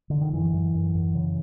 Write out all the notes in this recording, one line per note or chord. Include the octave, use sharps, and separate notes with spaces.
D3
D#3
F#2 E3
F#2
F#2
F#2
C#3